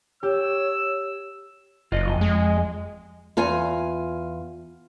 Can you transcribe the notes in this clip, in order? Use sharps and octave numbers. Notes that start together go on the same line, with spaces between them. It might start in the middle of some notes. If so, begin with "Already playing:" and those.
G4 C#5 E6
F#1 F4 D#5
F2 D#5
G#3
E2 F4 G#5